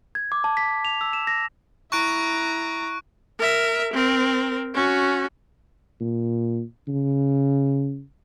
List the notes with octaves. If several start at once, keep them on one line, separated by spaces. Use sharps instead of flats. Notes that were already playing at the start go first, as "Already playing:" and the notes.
G#6
D6
A5
B6
F7
E6
E7
A#6
E4 A#5 C#6 F#6 D7
A#4 E5
C4 A#4
C#4 F#4
A#2
C#3